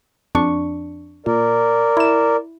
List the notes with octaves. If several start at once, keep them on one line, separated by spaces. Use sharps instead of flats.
F2 D4 C#6
A#2 A#4 D5
E4 E7